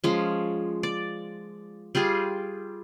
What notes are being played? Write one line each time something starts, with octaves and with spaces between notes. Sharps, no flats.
F3 G#3 C#4
D5
G3 F4 G4 G#4